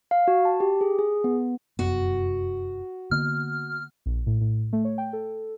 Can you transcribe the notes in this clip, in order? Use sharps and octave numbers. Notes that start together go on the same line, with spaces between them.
F5
F#4
A5
G4
G#4
G#4
B3
F1 F#2 B3 F#4
D3 A#3 B3 F6
A#1
A2
A2
A3
C#5
G5
A4